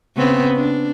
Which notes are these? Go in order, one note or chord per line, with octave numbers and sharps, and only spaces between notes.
C#3 B3 C4
D4